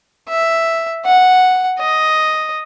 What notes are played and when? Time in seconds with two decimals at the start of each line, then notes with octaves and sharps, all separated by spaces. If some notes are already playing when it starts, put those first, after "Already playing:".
0.29 E5
1.05 F#5
1.80 D#5